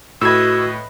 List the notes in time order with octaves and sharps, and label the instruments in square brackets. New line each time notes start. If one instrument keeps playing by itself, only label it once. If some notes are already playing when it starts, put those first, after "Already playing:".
[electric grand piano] A2 [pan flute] F#4 [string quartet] B4 D#5 B5 [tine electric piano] E6 G#6